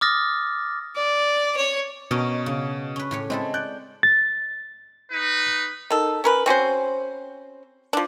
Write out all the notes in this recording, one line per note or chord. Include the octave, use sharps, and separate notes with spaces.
D6 D#6 F6 A6 A#6
D5
C#5
B2 C#4 A#4 D#5
C#3
C#4 B4
A2 G4 C#5
G#3 C4 E4 A4
D5 F#6 G6
A6
D#4 B4
D#3 A4
C#4 A#4 B4
C4 C#4 F#4 C5
F3 D4